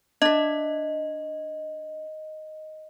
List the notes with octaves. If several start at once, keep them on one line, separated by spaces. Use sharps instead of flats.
D4 D#5 E5